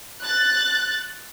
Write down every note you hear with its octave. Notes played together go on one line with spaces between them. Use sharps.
F#6 A6